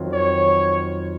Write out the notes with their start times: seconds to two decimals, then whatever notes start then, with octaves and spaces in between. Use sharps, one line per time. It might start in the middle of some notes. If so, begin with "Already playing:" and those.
Already playing: F2 D#3 F#3 F#4
0.13 C#5